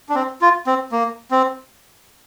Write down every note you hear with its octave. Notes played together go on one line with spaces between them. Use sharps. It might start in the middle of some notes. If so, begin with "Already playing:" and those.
D4
C4
F4
C4
A#3
C4